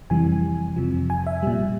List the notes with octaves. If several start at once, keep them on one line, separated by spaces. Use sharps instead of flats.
F2 C3 E3 G3 G#5
F2 C3 F3
G#5
E5
A#2 G3